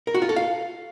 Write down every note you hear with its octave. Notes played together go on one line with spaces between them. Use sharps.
A#4
F#4
F4
A4
F5